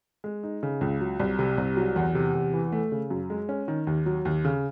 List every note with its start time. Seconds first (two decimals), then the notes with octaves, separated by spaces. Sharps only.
0.24 G#3
0.43 D#4
0.63 C#3
0.81 C#2
1.01 F#3
1.19 C2
1.39 C3
1.58 C2
1.77 F#3
1.96 E2
2.15 C3
2.34 E2
2.53 E3
2.72 A3
2.92 C#3
3.10 F#2
3.30 G#3
3.49 C#4
3.68 D#3
3.87 D#2
4.06 F#3
4.25 D#2
4.45 C#3